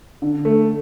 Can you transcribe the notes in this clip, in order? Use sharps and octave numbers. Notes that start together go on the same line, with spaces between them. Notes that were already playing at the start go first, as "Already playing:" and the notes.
D3
A3